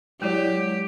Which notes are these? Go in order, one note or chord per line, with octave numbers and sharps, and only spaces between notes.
F#3 G#3 E4 G4 D5